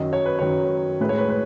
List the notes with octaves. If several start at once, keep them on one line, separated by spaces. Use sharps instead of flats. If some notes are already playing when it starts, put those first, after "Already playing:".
Already playing: F#2 D#3 F#3 D#5
C#5
B4
F#2 D#3 F#3 C#5
A2 G#3 B4
C#5
B4
B4